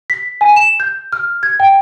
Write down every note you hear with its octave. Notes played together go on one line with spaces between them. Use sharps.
B6
G#5
E7
G6
F6
G#6
G5